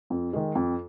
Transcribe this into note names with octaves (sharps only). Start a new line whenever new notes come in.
F2
D#3 G#3
F2